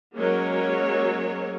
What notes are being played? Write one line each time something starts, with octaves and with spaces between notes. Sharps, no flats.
F#3 G#3 A#3 C#4 A#4 C#5